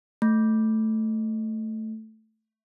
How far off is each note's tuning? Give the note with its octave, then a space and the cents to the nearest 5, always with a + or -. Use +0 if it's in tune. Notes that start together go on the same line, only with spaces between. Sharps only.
A3 +0